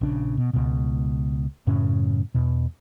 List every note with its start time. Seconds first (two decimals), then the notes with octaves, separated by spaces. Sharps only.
0.01 A#1 C#3 D4
0.37 B2
0.53 C#2 B2
1.67 F#2 A2 C#3 C#4
2.34 E2 B2